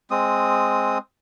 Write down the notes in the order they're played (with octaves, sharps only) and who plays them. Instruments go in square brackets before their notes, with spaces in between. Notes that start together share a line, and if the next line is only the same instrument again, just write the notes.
[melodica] G#3 C4 D#6